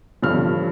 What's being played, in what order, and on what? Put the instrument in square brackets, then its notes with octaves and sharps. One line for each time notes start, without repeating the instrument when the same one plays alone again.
[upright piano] A1 G2 D3 F3 F6